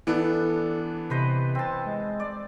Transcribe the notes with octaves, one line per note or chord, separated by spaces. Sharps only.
E3 B3 D4 A4
C3 B4 C5 D#5
C4 A5
G#3
D5